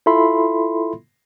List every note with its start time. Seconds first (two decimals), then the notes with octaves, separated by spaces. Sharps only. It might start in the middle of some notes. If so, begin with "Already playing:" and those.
0.06 E4 F4 A4 E5 B5 C6